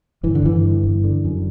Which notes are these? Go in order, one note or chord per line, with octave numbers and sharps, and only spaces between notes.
G1 E3
D3
G1 E3
G2
G1
D3
F#2